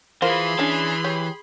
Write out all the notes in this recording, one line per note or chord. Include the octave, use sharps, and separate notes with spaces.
E3 F4 G#4 A#4 C5 B5 C6
E3 C#4 D4
G4 C#5